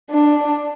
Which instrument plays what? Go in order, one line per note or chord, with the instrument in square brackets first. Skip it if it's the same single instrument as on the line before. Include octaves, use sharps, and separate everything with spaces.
[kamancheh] D4